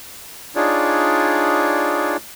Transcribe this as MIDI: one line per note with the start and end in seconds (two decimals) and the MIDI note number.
0.56 2.17 62
0.56 2.17 63
0.56 2.17 65
0.56 2.17 68
0.56 2.17 73
0.56 2.17 74